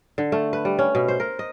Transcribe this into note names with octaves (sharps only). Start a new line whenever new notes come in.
D3
A3
B4
G3
C#4
B2
C5
A#4
D#5